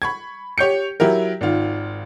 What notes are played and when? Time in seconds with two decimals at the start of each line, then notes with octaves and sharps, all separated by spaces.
0.02 B5 C#6 G#6
0.58 G4 C#5 G6 C#7
1.00 F#3 E4 G4 A#4
1.41 G#1 D#3 F4